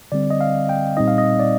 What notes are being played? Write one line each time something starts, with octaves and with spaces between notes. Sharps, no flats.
D3 G3 C4 D5
D#5
F5
G5
A#2 G3 C4 D#4 D#5
F5
D#5
D5